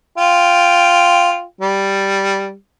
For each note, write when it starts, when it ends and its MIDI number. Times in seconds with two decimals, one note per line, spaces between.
0.18 1.43 65
0.18 1.43 79
1.61 2.53 55